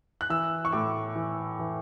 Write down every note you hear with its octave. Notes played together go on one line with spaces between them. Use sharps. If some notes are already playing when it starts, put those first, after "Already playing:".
F#6
E3 E6
C#6
A2 D6
E3
E3